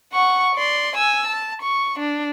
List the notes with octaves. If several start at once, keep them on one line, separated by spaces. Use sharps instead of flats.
F#5 C#6
D5 C6
G#5 E6
A5
C#6
D4